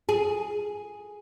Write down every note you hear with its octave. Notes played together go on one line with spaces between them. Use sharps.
G#4